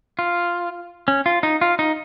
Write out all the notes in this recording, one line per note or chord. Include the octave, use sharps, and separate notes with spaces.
F4
C#4
F4
D#4
F4
D#4